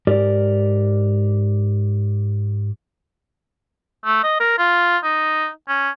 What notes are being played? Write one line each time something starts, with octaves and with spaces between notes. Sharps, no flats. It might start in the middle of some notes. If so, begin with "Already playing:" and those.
G#2 G4 A#4 D5
A3
D#5
A#4
F4
D#4
C#4